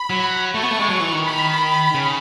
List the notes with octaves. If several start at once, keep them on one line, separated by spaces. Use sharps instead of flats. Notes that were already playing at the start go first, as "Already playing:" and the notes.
Already playing: B5
F#3
A3 C#6
B3
A3
G#3
F#3
E3
D#3
B5
C#3